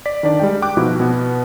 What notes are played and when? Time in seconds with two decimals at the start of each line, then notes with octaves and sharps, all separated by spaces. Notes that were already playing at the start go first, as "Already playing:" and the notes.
0.06 D5 B6
0.23 D#3 D4 D5
0.40 G3 G#3 G5
0.62 G5 D6 F#6
0.77 B2 F3 D#4 E4 F#4
1.00 B2 B3